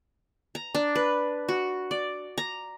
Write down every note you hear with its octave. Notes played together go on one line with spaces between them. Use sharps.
A#5
D4
B4
F#4
D5
A#5